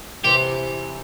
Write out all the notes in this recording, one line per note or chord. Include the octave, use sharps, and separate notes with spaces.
C3 E3 G4